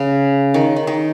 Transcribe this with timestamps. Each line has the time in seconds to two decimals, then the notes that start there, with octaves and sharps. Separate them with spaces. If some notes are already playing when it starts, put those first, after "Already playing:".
Already playing: C#3
0.54 D#3
0.76 D#3
0.87 D#3